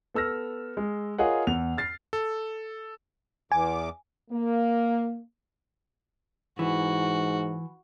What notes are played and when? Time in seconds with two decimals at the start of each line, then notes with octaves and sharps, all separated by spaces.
0.14 B3 A4 E6 F6 A#6
0.77 G#3
1.18 F4 G#4 A#4 C#5 D#5 F#5
1.47 E2 F7
1.77 F6 A6 C7
2.13 A4
3.52 E2 G#5 D6
4.30 A#3
6.59 G#2 E3 F#4